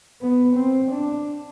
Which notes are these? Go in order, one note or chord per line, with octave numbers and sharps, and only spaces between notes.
B3
C4
D4